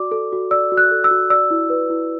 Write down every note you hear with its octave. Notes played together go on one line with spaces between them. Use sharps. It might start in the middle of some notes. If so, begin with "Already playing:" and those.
Already playing: F#4 D5 D6
A4
F#4
D5 E6
F#4
F#6
A4
E6
F#4
D5 E6
E4
B4
E4